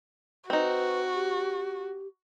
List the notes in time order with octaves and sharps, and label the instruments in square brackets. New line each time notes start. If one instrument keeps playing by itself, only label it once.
[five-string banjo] C4 D#4 [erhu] F#4 [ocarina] B4
[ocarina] G4